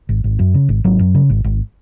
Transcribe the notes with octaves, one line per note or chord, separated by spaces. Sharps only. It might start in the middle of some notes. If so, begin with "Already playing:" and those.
G#1
G#1
F#2
C#3
G#1
G#1 F#3
F#2
C#3
G#1
G#1